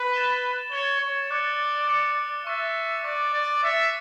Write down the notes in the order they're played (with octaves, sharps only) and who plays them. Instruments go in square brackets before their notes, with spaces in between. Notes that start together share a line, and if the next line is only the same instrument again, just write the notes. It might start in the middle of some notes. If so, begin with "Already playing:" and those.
Already playing: [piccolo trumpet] B4
[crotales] A6 E7 G7
[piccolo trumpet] C#5 [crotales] A6 E7 G7
[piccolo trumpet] C#5
[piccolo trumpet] D5 [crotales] D6 F#6 C#7
[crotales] D6 F#6 C#7
[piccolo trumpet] E5 [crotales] C#6 F#6 A6
[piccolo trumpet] D5 [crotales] C#6 F#6 A6
[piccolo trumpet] D5
[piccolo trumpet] E5 [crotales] D6 A6 C#7